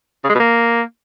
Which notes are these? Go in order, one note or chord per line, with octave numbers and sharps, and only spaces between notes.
C#3
G#3
B2
A#3